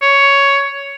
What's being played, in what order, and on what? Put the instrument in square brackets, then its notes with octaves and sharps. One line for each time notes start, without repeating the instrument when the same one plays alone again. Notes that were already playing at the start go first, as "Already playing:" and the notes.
[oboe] C#5